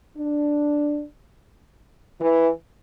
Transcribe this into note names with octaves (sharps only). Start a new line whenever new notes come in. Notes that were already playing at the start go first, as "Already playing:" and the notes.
D4
E3